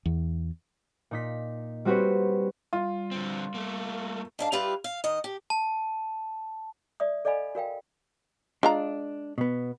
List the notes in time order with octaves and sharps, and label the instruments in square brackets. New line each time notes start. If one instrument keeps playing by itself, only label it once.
[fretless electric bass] E2
[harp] A#2 D#4 B6
G3 C4 F#4 G4 B4 C#5
[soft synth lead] G3 [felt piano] F4
[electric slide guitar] D3 C4
A3 A#3
[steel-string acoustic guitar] G#2 D4 F5
G3 E4 F4 G4 B4 F5
F5
D#3 D#5
G4
[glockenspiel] A5
[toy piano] D5 E5 D#6
A4 D5 D#5 F5 G#5 B5
F#4 A#4 F5 G5
[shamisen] G#3 F4 A#5 [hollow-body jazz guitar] D4
[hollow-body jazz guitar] B2 B3